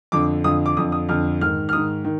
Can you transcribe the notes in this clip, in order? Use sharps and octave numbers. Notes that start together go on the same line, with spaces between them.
F2 D3 D6
F2 D3 D#6
D6
F2 D3 D#6
D#6
F2 D3 F6
G#2 D#3 F6
F6
G#2 D#3 D#6
D#3